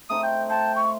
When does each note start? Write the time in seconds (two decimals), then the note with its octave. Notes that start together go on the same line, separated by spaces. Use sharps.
0.10 A3 C4 D#4 D#6
0.23 G5
0.50 F4 G5 A5
0.76 C#6